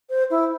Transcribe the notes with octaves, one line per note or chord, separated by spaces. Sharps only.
C5
E4